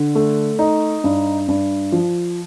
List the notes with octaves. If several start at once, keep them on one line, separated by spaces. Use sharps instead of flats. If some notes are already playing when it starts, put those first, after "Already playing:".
Already playing: D3
A3
D#4
G2
G2
F3